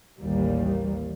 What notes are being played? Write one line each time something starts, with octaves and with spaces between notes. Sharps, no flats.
A1 D#2 D#3 E3 G3 A#3